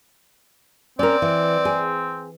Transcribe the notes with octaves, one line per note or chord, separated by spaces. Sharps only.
C4 C#4 A#4 D5
E3
G#4